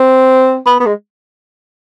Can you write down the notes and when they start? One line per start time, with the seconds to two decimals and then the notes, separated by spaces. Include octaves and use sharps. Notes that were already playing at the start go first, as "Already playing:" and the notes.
Already playing: C4
0.66 B3
0.80 B3
0.86 G#3